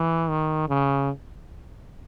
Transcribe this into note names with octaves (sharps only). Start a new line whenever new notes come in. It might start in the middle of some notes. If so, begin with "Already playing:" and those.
Already playing: E3
D#3
C#3